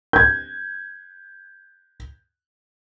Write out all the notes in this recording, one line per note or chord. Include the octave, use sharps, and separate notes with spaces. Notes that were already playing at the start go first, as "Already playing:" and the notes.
G6 G#6